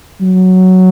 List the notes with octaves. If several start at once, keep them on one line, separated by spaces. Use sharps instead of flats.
F#3